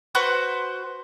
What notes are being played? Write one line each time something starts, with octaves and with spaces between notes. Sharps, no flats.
F#4 B4 C5 C#6